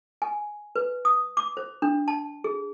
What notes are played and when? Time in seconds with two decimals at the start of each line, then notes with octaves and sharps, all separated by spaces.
0.22 G#5
0.76 B4
1.05 D#6
1.37 D6
1.57 C5
1.82 D4
2.08 A5
2.44 G#4